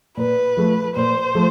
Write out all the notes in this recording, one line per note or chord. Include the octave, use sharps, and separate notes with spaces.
A#2 B4
F3 A3
A#2 C5
F3 A3